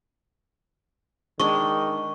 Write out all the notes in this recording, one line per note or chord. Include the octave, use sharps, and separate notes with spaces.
D#3 G#3 D4 C#6